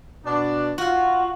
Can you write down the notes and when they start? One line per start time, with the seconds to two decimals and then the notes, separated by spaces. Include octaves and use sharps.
0.25 B2 D4
0.78 F4 F#4